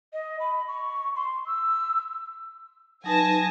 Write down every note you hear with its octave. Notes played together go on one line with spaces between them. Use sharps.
D#5
B5
C#6
C6
E6
F#3 D#4 B4 G#5 A5 A#6